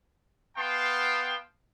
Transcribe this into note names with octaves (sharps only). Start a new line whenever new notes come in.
B3 F5 G5 A5 C6